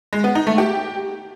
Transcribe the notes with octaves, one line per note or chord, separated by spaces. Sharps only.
G#3
B3
D#4
A3
G4